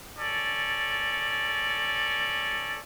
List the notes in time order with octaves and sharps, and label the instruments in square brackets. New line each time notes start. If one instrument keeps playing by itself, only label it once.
[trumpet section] C#4 A4 D5